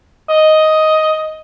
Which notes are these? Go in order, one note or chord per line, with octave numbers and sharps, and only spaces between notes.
D#5